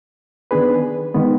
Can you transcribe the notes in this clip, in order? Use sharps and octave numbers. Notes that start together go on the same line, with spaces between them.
D#3 B3 D4 G#4 B4
D#3 G#3 B3